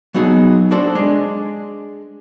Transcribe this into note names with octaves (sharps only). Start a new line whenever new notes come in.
F#3 B3 D#4 F#4 G#4
D4 F#4 A4 C5 D5
G#3 D4 G#4